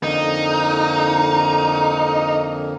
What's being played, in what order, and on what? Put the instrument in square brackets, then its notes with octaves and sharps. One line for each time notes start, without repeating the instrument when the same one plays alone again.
[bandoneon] F2 D3 A#3 [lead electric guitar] D#4